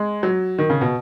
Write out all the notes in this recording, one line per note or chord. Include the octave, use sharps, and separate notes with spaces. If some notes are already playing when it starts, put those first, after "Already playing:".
Already playing: G#3
F#3
D#3
C#3
B2